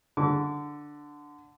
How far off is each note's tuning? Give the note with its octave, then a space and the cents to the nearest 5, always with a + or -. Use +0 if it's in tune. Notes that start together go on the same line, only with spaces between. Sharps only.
D3 +0 D6 -35